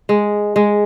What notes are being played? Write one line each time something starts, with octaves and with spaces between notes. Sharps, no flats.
G#3
G#3